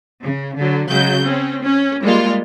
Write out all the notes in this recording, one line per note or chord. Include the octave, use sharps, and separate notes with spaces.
C#3
D3 F#3
C#3 F#3 G#3 G6
C4 C#4
C#4
G3 G#3 A#3 F4